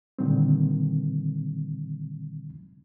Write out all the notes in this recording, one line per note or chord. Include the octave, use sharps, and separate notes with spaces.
A#2 D3 D#3 G3 C4